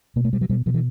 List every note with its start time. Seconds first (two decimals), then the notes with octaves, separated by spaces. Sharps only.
0.16 B2 A#3
0.25 A3
0.33 B2 G3
0.41 F#3
0.49 B2 G3
0.66 B2 F3
0.74 E3